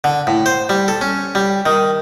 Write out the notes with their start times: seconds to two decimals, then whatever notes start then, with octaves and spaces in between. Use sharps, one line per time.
0.04 D3
0.27 A2
0.46 C5
0.69 G3
0.88 A4
1.01 C#4
1.35 G3
1.66 D#3